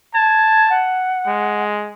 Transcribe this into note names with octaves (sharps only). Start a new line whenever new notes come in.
A5 G#6
F#5
G#3